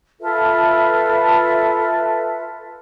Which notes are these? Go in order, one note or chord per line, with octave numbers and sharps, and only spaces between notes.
F4 A4 B4 E5